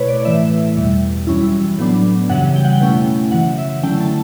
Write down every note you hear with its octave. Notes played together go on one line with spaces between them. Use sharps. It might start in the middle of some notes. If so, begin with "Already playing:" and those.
Already playing: B2 A3 E4 B4 C#5
D5
D5
A2 E3 A3 E4 E5
E2 B2 G3
F#2 E3 G3 C#4 E4
A2 F#3 B3 D4
F#2 C#3 E3 G3 F#5
G5
F#5
G5
B2 A3 C#4 E4
F#2 C#3 E3 F#5
E5
D3 F#3 A3 C#4 E4 G5
A5